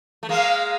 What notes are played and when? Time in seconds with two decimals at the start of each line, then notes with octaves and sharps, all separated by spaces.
0.23 A3
0.29 G#3 A#3 F5